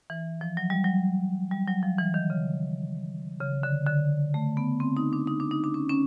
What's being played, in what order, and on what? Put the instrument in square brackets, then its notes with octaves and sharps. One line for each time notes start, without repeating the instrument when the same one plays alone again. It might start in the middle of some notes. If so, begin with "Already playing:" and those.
[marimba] E3
F3
F#3
G3
F#3
G3
F#3
F3
E3
D#3
C#3
C#3
D3
D3
A3
B3
C4
D#4
D4
D#4
D4
D#4
D4
C#4
C#4